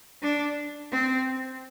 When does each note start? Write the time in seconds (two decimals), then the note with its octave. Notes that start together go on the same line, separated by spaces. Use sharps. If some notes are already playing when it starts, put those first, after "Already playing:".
0.23 D4
0.92 C4